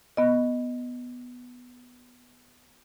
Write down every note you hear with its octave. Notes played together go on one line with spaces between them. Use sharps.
B3 D#5